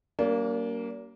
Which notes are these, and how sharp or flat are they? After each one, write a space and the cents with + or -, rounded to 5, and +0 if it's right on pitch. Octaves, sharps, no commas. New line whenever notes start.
G3 -40 A#3 +0 D4 -45